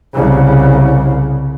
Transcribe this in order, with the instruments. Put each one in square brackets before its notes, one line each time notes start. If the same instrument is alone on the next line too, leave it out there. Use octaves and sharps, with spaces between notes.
[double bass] C2 C#3